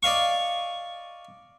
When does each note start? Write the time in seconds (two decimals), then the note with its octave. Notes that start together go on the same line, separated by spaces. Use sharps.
0.03 D5 D#5 F5 C#6